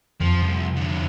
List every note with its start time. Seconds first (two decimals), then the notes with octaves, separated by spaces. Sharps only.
0.21 F2 F3
0.41 C2
0.77 D3 F3